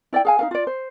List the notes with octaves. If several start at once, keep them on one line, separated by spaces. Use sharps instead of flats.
E4 D5 D#5 G5
G#4 F5 G#5
D#4 A4 F5
F4 D5
C5